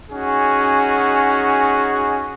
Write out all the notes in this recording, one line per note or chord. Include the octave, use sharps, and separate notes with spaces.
C#4 D#4 F#4 G#4